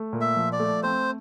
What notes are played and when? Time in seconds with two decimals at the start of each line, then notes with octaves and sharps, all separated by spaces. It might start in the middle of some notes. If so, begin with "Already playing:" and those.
Already playing: A3
0.13 A#2
0.21 E5
0.37 F3
0.52 D5
0.59 A3
0.83 C4 C5